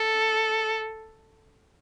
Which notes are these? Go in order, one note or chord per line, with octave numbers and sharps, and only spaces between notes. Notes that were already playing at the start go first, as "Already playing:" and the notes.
Already playing: A4